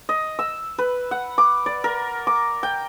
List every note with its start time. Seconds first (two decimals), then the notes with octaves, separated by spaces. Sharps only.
0.09 D#5
0.39 E6
0.78 B4
1.11 F#5
1.38 D6
1.66 D5
1.84 A#4
2.27 D6
2.63 G5